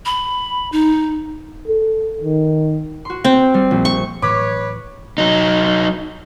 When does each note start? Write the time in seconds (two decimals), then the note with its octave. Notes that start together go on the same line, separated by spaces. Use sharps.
0.06 B5
0.72 D#4
1.67 A4
2.21 D#3
3.05 F#4 C6
3.24 C4
3.54 G3 C7
3.71 A#1
3.85 C#6
4.22 A2 E3 F#3 B4 C#5 D6
5.18 F#3 D#4